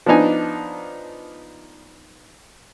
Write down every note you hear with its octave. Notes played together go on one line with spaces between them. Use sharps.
F3 B3 D4 D#4 G#5